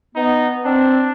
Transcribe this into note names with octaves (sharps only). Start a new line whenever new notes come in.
B3 D#4
C4 D4